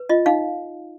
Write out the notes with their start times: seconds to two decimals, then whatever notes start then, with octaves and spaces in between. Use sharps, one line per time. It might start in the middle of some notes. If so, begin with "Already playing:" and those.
Already playing: B4
0.09 F4 D#5
0.26 D#4 F5